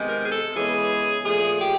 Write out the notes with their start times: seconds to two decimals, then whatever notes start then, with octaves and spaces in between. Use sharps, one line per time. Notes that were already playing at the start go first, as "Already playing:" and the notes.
Already playing: C3 D#3 G#3 B3
0.08 A#4
0.25 G#4
0.31 A4
0.54 C#3 E3 G#3 B3 G#4
1.25 A#2 F3 A3 G#4
1.60 G4